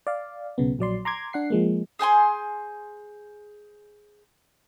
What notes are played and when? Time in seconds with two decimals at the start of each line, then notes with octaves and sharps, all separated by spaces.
0.07 D5 F5
0.58 B1 C#3 B3
0.79 A#1 F#3 D5 C6
1.05 A#5 C6 D6 G#6
1.33 D4 F#5 C7
1.50 F3 G#3 A#3
1.99 G#4 C5 G#5 C6